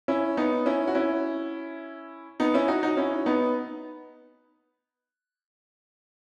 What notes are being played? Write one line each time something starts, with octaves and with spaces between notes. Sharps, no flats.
C#4 E4
B3 D#4
C#4 E4
F#4
C#4 E4
B3 D#4
C#4 E4
D#4 F#4
D#4 F#4
C#4 E4
B3 D#4